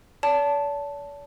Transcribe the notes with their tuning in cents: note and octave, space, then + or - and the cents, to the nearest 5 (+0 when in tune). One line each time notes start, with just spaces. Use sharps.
D5 -45 A5 +0